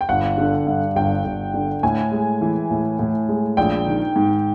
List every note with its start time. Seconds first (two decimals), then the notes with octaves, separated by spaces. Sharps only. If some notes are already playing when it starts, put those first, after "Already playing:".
0.01 G5
0.09 G1 F#5
0.38 D3
0.67 G2
0.96 G1 G5
1.25 G1
1.54 D3
1.83 A2 G#5
2.12 G#3
2.41 E3
2.71 A2
2.99 A2
3.29 G#3
3.57 A#1 G5
3.86 D#3
4.16 G#2